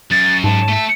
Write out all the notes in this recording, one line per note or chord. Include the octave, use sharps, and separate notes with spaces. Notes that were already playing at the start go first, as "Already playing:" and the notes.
F#2 A6
G#2 A5
A3 E5